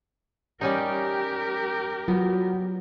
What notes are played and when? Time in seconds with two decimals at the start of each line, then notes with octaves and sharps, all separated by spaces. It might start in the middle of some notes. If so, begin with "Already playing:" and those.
0.61 G3 C#4 D#4 G4 A#4
2.08 F#3 B3 F4